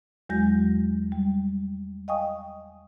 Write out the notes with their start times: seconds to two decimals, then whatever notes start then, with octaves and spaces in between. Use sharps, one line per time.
0.29 E2 F#3 G#3 F#4 G6 A#6
1.12 G3
2.08 D#5 F5 G5 G#5 C#6 D#6